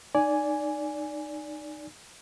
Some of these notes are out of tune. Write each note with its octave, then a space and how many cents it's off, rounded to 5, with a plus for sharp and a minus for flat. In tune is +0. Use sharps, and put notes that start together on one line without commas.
D#4 -25 D5 -15 G#5 +0